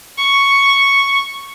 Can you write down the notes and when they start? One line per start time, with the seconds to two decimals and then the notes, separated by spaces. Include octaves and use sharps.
0.18 C#6